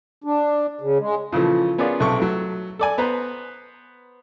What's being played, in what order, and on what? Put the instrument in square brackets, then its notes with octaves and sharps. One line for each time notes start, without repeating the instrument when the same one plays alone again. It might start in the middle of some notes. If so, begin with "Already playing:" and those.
[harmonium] D4
C#3
G#3
[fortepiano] A#2 C#3 E3 F3 A4
B3 C#4 F4 G#4 A#4 D5
B1 C3 A4 C#6
F#3 A3
A4 D5 G#5
B3 B4 C5 A#5